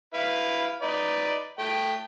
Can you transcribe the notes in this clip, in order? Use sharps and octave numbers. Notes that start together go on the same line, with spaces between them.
E4 B4 F5
D#4 B4 D5
A3 G5